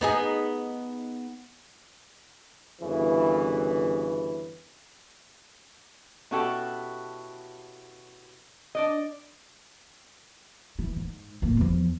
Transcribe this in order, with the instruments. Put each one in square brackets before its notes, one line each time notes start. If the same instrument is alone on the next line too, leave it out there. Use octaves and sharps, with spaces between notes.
[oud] B3 D#4 G#4
[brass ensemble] G1 F#2 C#3 E3
[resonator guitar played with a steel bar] B2 C#4 E4 F#4 G4 A4
D4 D5 D#5
[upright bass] E3
G#2
A2 A#3
E2 F3